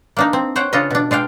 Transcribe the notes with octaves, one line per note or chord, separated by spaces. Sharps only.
A#3 D4 D#4
C4
C5 C#5 F#5 G5
C#3 D4 F4 A4 D#5
B2 D4
G#3 D4 F5 G5